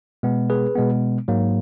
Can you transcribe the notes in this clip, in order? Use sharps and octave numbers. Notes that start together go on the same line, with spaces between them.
B2 G#3 B3
G#4 B4
B2 G#3 B3
G#2 F#3 A#3